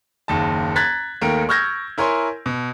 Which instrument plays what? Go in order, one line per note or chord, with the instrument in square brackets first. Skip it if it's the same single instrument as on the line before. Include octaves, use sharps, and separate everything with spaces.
[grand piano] F#1 D#2 A5
A#5 F#6 G#6 A6 B6
D#2 D#3 A3 A#4 D7
C#6 E6 F6 G6 G#6 A#6
E4 A#4 C#5 G#5 C6
B2